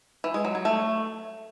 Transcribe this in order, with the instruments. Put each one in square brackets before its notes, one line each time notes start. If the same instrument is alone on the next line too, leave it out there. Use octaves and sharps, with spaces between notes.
[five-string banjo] E3
G#3
F#3
F#3
A3